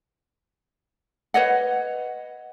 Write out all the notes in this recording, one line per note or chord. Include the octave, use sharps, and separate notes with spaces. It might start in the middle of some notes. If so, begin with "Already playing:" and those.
B4 C#5 D#5 F#5